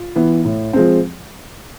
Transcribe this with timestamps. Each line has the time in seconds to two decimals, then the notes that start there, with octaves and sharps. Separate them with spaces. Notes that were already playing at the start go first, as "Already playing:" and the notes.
Already playing: F4
0.16 E3 B3
0.45 A2
0.73 F3 G#3 C4